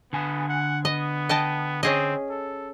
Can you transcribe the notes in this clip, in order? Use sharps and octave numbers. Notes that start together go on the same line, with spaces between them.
D3 B3 G#5
F#5
B3 D#5
D#5 G5 A5
C4 C#4 G#4 D#5
A4